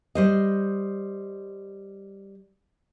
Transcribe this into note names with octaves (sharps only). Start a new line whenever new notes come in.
G3 C5 D#5